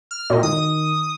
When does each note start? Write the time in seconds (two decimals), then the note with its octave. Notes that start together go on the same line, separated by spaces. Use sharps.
0.11 F6
0.30 A#2 F#4 D#5
0.43 D#3 D#6